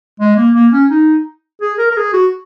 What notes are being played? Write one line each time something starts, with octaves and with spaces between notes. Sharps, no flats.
G#3
A#3
A#3
C#4
D#4
G#4
A#4
A#4
G#4
F#4